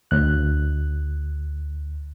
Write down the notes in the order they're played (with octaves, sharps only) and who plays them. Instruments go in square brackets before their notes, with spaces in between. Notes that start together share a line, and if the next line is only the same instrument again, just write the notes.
[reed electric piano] D2 F#6